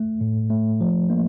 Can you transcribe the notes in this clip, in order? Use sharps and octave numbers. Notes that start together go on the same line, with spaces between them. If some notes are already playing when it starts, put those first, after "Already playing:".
Already playing: A3
A2
A3
F3
A#3